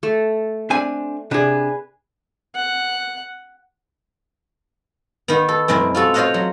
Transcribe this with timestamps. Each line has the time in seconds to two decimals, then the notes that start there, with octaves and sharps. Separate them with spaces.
0.03 A3
0.70 C4 D4 G#5
1.31 C3 D4 G#4 B4
2.55 F#5
5.28 D#3 B3
5.49 A4
5.68 F#2 B2 G#3 C4 E4
5.95 F4 F#4 A4
6.14 F4 C5 C#5 D#5 F5 F#5
6.34 F#3